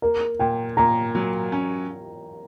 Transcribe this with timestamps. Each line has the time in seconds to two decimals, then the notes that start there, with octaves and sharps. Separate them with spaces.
0.02 A#3 A#4
0.39 A#2 G5
0.77 A#2 A#5
1.15 F#3
1.52 C#4